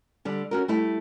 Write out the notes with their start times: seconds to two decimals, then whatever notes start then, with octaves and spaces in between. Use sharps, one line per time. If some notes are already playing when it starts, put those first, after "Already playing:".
0.25 D3 G3
0.51 C#4 F#4 A#4
0.68 G3 A3 E4